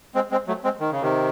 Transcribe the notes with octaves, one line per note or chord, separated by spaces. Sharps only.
G#3 C4
G#3 C4
F#3 A3
G#3 C4
D#3
C#3
C3 D#3